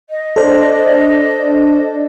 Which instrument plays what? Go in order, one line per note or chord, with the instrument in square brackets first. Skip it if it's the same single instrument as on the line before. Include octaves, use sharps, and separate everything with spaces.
[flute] D#5
[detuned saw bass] D4 [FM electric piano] A4 C5